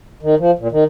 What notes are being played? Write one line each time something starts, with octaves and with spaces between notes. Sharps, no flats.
D#3
F3
A#2
D#3